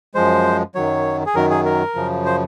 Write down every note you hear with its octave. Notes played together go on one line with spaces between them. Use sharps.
F#2 F3 G#3 C5
F#2 D#3 F#3 C#5
G#4
F#2 D#3 F#3 A#4
G#4
A#4
F#2 C#3 F3
C5